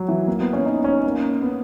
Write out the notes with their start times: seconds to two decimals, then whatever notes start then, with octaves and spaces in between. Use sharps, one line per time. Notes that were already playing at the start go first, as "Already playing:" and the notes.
Already playing: F#3
0.09 E3
0.27 A#3
0.40 B3
0.53 C#4
0.65 D#4
0.84 C#4
1.04 A#3
1.42 B3